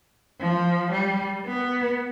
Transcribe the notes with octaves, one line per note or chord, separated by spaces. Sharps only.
F3
G3
B3